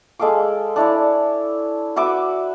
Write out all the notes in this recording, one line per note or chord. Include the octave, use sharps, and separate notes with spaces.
G#3 A4 F5 D6
D4 E4 C#5 D5
F#4 B4 E5 D6